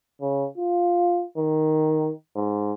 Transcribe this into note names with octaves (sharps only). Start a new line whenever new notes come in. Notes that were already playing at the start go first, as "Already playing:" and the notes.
C#3
F4
D#3
G#2